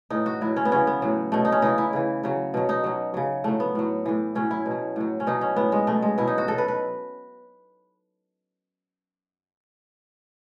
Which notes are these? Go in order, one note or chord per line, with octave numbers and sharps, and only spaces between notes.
A2 E3 D#4
F#4
A2 F#3 E4
C#4
B3
C#3 E3 C#4
B3
A2 F#3
B2 F#3 A3
D#4
C#4
C#3 E3 D#4
E4
C#3 E3
C#3 F#3
B2 F#3
D#4
B2 F#3
C#3 F#3
A2 F#3 A3
B3
A2 F#3
A2 E3
A2 F#3 C#4
E4
B2
F#3
A2 F#3
C#4
B2 F#3 D#4
C#4
A2 F#3 B3
G#3
B2 F#3 A3
G#3
B2 F#3 E4
D#4
F#4
B2 F#3 A4
B4
B4